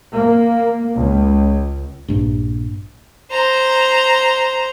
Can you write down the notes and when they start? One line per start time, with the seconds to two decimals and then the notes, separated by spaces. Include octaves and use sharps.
0.13 A#3
0.95 C#2
2.08 A#1 G2
3.32 C5 A#5